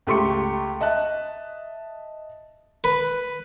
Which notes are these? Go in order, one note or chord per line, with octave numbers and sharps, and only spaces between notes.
C#2 A3 G4 C6 C#6 C#7
D#5 E5 A5 F#6
B4